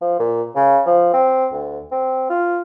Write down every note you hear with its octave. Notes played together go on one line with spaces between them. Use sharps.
F3
A#2
C#3
F3
C4
D2
C4
F4